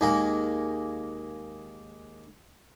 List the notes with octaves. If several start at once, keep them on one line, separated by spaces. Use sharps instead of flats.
D#2 G#3 A#3